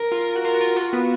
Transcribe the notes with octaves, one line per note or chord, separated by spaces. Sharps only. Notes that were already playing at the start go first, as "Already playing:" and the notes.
Already playing: A#4
F4
F#4
F4 A#4
F#4
F4
F4 F#4
B3